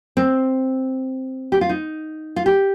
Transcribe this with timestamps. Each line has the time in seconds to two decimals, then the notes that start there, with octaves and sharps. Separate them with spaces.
0.17 C4
1.52 G4
1.61 F4
1.69 D#4
2.36 F4
2.46 G4